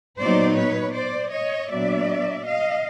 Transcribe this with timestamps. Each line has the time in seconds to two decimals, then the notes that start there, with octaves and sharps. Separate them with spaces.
0.19 A#2 F#3 B3 D#4 C5 D5
0.57 B4 C#5
0.94 C5 D5
1.32 C#5 D#5
1.70 A#2 F#3 B3 D4 D5 E5
2.45 D#5 F5